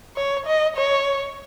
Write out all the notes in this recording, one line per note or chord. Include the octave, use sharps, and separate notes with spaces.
C#5
D#5
C#5